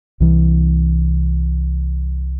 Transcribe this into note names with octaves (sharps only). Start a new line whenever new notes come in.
C2 E3